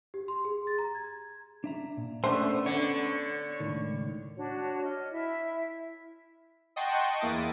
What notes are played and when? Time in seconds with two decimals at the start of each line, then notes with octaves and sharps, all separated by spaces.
0.14 G4
0.28 C6
0.45 G#4
0.67 A6
0.78 A#5
0.95 G#6
1.64 D4 E5 A#5
1.97 A#2
2.24 A3 B3 C#4 D4 C5
2.66 D3 C#5
3.60 C#2 A2 D#3
4.37 D4 F#4 C#5
4.84 D#5 F6
5.11 E4 E5
6.76 D#5 F#5 G5 A5 C6 C#6
7.19 E2 A#3 E4 D#6 A6 D7